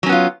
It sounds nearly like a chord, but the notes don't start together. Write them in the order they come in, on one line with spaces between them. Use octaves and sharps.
F#3 C#4 B3 F4